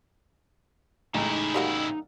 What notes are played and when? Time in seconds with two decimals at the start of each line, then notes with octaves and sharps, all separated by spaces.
1.14 A1 C#3 G#3 D#4 E4 A#5
1.54 G3 A#3 F#4